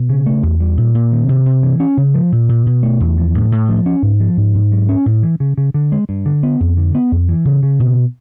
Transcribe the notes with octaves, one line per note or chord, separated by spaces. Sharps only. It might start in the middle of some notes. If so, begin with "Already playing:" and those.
Already playing: B2
C#3
A3
E2
G3
A#2
A#2
D#3
C3
C3
E3
C#4
C#3
F3
A#2
A#2
B2
A3
E2
F3
A2
A2
F3
C#4
G#2
F3
G#2
G#2
F#3
C#4
A2
E3
C#3
C#3
D3
G#3
G2
D3
B3
F2
D3
B3
F2
E3
C#3
C#3
B2